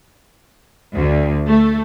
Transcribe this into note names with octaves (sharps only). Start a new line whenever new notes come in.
D2
A3